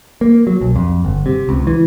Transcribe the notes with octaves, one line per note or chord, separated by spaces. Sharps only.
A#3
F#3
B1
F2
G1
C3
C#2
E3